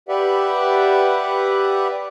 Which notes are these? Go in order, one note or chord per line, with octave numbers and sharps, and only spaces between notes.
G4 B4 D5 E5 F#5